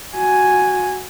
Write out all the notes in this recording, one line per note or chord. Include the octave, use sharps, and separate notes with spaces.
F#4 G#5